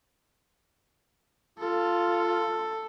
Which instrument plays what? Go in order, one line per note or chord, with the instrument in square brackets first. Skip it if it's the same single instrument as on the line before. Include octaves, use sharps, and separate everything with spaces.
[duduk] F4 [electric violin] A4